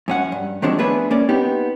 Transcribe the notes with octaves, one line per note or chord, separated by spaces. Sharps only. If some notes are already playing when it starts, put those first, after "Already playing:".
F#2 C#4 F#5
G2
D#3 F3 F#3 G#3 C4 D4
A3 B3 D4 G#4 B4
A#3 C#4 D5
B3 C4 D#4 G4